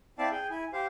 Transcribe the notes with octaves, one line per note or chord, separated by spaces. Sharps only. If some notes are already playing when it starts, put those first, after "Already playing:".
C4 E4 D5 E5 F5 A5
G#4 G5
E4 G#5
G4 C5 F5